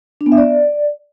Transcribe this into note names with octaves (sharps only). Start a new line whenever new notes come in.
D4
B3
E5
D5